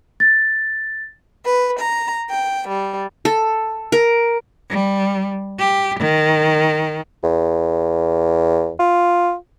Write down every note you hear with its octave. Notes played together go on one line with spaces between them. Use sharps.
A6
B4
A#5
G5
G3
A4
A#4
G3
G4
D#3
E2
F4